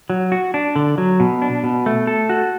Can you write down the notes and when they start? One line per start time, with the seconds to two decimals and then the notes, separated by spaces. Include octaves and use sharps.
0.10 F#3
0.32 F#4
0.54 D4
0.76 D3
0.98 F#3
1.20 B2
1.42 D4
1.64 B2
1.86 A3
2.07 A4
2.29 F#4